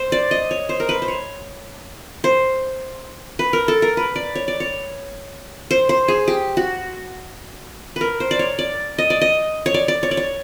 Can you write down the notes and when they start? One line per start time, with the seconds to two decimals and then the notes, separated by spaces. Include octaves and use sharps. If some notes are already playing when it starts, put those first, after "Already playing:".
Already playing: C5
0.12 D5
0.31 D#5
0.51 C#5
0.69 C5
0.80 A#4
0.89 B4
1.02 C5
1.08 C#5
2.24 C5
3.39 B4
3.53 A#4
3.68 A4
3.82 A#4
3.97 B4
4.16 D5
4.35 C#5
4.48 D5
4.60 C#5
5.71 C5
5.89 C5
6.08 G#4
6.28 G4
6.57 F#4
7.96 A#4 B4
8.20 C5
8.31 D5
8.39 C#5
8.59 D5
8.98 D#5
9.10 D5
9.21 D#5
9.66 C#5
9.74 D5
9.88 D5
10.03 C#5
10.11 D5
10.17 C#5